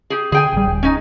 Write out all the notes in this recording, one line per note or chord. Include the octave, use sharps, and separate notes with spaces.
G4 G#4
D3 G#4 G5 G#5
A1 G3
D#1
C#4 D#4